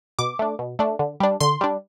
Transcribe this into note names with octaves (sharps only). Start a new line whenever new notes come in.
B2 D6
A3 D4
B2
A3 D4
D3
G3 D4
D3 C6
G3 D4